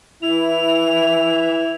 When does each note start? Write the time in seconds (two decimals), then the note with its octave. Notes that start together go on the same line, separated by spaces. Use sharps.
0.22 E3 E4 F7